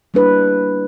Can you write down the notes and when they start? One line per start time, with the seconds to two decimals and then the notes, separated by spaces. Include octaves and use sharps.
0.14 G3 A#3 D4 E4 B4